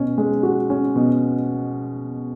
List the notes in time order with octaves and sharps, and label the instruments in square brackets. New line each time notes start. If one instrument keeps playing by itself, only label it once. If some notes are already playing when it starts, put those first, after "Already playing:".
Already playing: [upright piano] B2 C#4
G#3
F#4
C#4
B2